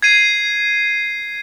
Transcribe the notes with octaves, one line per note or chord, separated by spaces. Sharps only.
G#6 C7 D#7